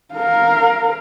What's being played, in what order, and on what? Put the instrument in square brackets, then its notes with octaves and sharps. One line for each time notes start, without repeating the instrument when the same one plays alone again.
[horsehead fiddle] A#4 F5